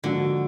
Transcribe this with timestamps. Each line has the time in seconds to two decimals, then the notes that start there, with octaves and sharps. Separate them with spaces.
0.04 G#2 D3 F3 A#3 D4 F#4